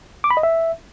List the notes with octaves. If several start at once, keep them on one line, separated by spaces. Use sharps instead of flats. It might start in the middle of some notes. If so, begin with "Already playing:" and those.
D6
B5
D#5
E5